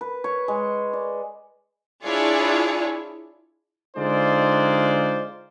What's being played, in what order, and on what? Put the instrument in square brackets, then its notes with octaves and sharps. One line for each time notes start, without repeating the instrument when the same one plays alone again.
[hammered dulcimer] B4
C#5
G#3
D5
[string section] D4 E4 F4 G#4 C#5 D5
[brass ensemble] D3 G#3 D#4 F4 C5 D5